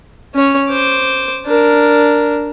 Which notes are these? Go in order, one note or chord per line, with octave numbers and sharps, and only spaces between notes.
C#4 C#5
C5 D6
D4 A#4